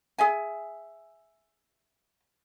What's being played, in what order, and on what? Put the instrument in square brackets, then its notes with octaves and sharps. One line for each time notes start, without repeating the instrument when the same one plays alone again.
[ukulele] G#4 E5 G#5